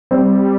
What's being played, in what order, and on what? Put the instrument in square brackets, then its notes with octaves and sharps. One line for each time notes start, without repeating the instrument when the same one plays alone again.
[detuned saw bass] G3 [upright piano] C4